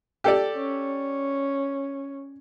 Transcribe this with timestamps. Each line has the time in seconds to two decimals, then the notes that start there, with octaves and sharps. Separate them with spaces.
0.24 G4 A4 D5
0.57 C#4